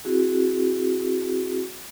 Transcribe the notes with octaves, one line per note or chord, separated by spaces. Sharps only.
C4 E4 F#4 G#4